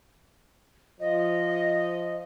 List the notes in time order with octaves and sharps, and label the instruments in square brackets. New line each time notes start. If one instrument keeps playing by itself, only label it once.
[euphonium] F3 [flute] D#5